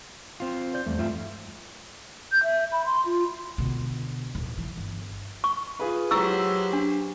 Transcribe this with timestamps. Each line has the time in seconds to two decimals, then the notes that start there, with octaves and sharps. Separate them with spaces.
0.40 C4 F4
0.74 C5 D5 G6
0.86 E2 G3 A3
0.99 G2 F4 E5
2.32 G6
2.43 E5
2.72 B5
2.86 C6
3.06 F4
3.58 B2 D3
4.35 D1
4.58 E3
4.77 G1
5.44 C#6
5.79 F4 G#4 B4
6.11 F#3 E4 G4 C5 C#6 E6
6.73 D4